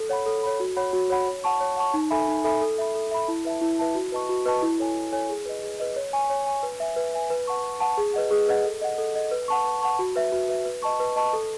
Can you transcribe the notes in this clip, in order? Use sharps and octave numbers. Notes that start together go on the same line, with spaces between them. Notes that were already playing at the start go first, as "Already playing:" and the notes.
Already playing: A4
C#5 F#5 B5
A4
C#5 F#5 B5
F#4
C#5 F#5 B5
F#4
C#5 F#5 B5
C#5
F#5 A5 C#6
C#5
F#5 A5 C#6
D#4
A4 E5 G#5 B5
D#4
A4 E5 G#5 B5
A4
E5 B5
A4
E5 B5
E4
B4 E5 A5
E4
B4 E5 A5
F#4
B4 D#5 A5 C#6
F#4
B4 D#5 A5 C#6
E4
A4 C#5 G#5
E4
A4 C#5 G#5
G#4
B4 D#5
G#4
B4 D#5
C#5
G#5 C#6
C#5
G#5 C#6
B4
E5 G#5
B4
E5 G#5
B4
F#5 A5 C#6
B4
F#5 A5 C#6
G#4
B4 D#5 F#5
G#4
B4 D#5 F#5
A4
D#5 F#5
A4
D#5 F#5
B4
F#5 A5 C#6
B4
F#5 A5 C#6
F#4
B4 E5
F#4
B4 E5
B4
D#5 A5 C#6
B4
D#5 A5 C#6
A4